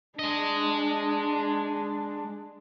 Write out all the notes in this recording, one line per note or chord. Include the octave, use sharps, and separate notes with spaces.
G#3 D4 D#5